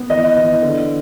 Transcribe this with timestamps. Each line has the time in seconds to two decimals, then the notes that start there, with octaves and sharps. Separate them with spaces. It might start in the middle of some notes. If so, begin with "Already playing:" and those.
Already playing: B3
0.10 E3 D#5
0.36 E3
0.62 D3